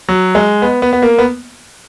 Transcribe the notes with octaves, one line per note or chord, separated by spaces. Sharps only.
F#3
G#3
B3
B3
B3
A#3
B3